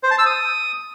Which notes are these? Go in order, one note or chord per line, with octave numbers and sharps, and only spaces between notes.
C5
A5
E6
D#6